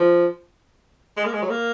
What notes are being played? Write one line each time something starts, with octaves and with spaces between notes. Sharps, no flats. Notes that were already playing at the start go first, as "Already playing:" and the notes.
Already playing: F3
G#3
A#3
G#3
F#3
A#3